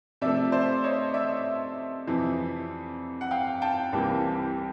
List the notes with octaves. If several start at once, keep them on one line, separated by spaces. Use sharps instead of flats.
C3 F3 A3 D5 E5
C5 D5
C#5 D#5
D5 E5
F2 C3 E3
F#5
F5 G5
G5 A5
C2 C3 E3 G3 A#3